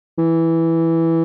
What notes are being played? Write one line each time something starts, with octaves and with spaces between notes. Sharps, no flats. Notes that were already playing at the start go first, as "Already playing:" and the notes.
E3